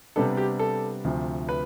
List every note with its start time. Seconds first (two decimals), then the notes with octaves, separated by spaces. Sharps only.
0.16 C3 G3 B3 D4 A4
0.37 G4
0.59 A4
1.04 D2 C3 F3
1.49 B4